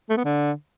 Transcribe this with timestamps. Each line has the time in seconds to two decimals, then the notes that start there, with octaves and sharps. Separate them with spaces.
0.10 A3
0.17 B3
0.24 D3